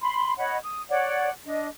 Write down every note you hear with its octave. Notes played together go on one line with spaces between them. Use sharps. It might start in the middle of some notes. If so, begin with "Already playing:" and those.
B5 C6
C#5 D#5 F#5 B5
D#6
C#5 D5 F#5
D4 D#5